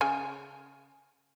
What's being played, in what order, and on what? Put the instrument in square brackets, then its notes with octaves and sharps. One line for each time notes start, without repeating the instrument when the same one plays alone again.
[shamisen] C#3 G#5